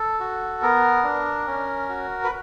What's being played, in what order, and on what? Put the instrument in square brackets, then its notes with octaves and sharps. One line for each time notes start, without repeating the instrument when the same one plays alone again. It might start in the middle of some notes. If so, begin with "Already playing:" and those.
Already playing: [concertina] A4
F#4
B3 A#4
D4
C#4
F#4
B4